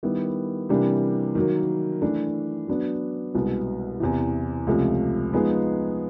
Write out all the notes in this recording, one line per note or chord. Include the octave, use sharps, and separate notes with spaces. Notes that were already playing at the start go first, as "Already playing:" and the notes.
D#3 G3 B3 E4
C3 E3 G3 A#3 D4
D#3 F#3 A#3
E3 A3 D4
F#3 B3 D4
C2 B2 G#3 B3
E2 C3 E3
C#2 C3 F3 A3
F3 G#3 B3 D#4 G#4